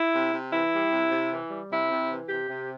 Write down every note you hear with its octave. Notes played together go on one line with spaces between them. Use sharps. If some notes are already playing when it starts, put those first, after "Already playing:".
Already playing: E4
C3
C3
E3 E4
G3
C3
C3
E3
G3
C3 E4
C3
E3
C3 G4
C3